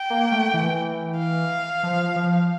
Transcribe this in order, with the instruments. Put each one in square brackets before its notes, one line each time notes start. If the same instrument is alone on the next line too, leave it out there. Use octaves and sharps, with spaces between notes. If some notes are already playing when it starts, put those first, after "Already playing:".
Already playing: [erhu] G5
[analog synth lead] A#3
A3
E3
[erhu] F5
[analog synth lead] F3
F3